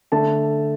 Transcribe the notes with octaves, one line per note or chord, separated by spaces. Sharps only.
D3 A3 A5